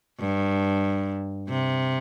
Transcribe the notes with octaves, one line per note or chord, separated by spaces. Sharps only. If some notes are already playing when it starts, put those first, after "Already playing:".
G2
C3